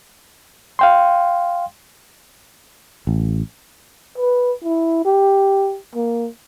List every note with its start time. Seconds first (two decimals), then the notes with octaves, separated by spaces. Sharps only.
0.79 F5 G5 C6
3.07 A1
4.18 B4
4.63 E4
5.06 G4
5.95 A#3